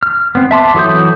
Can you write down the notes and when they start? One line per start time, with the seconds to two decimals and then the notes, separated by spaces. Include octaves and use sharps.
0.03 F6
0.35 B3 C4
0.51 E5 A5 C6 D6
0.74 E3 F#3 A4 D#6 G6